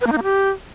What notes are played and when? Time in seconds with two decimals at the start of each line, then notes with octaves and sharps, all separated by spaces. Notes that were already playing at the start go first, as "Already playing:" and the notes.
0.01 B4
0.07 A#3
0.12 D#4
0.18 A#3
0.23 G4